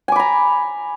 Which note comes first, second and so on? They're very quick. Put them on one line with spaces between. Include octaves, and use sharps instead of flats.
G#5 D6 B5 A#5